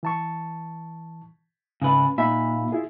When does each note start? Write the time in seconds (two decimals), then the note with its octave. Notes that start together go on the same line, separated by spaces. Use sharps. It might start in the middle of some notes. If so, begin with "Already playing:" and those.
0.03 E3 A5 C#6
1.82 G#2 C#3 B4
2.18 A#2 D#4 E5 B5
2.72 E4 F4 G#4